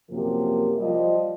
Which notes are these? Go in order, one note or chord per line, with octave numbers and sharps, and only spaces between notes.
F#2 C3 F3 A#3
F3 G3 D#5